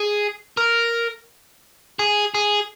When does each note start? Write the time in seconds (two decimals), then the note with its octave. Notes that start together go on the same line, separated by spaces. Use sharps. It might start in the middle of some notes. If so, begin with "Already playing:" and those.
Already playing: G#4
0.57 A#4
1.99 G#4
2.34 G#4